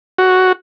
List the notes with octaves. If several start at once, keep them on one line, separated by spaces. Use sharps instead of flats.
F#4